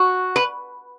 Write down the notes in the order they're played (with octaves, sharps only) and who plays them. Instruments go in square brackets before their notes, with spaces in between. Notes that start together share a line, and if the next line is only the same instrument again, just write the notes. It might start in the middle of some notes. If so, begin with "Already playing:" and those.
Already playing: [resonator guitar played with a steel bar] F#4
B4